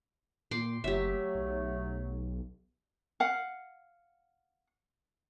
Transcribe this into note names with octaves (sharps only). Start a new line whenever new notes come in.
A#2 G5 C6 D6
F#1 F#3 A3 G4 E5
B1
F5 F#5